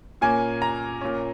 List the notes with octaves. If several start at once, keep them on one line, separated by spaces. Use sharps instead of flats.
A#2 A#3 C#4 G#5
A#5
A#2 A#3 C#4